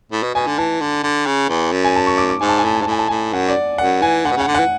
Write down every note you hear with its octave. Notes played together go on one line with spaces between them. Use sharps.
A2
B2
B2 G#5
D3
E3 A5
D3
D3
C#3
E2
F#2
G#5
A5
C#6
D6
D6
G#2 G#5
A5
G#5
A2 A5
G#5
G#2 A5
A2 G#5
A5
A2 G#5
F#2 F#5
D5
F#2 F#5
E3 G#5
D3 F#5
B2
C#3 F#5
D3
E3 F#5